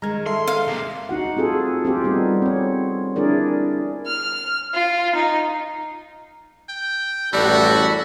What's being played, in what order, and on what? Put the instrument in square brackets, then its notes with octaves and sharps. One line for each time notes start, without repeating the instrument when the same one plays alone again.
[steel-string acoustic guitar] D#3 G#3 [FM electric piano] A#5 F6 G#6
[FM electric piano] A4 E5 [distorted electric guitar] C6
[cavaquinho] F5
[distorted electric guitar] C3 A#3
[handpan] D#4 F#4 F#5
C4 F4 G#4 A4
C4 F4 G4 G#4
G3 B3 D#4
C4 C#5
D4 E4 G#4 A#4 D5
[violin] F6
F4
D#4
[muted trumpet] G5
[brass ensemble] A1 [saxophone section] F#2 G3 [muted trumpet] F#4 [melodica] A4 B5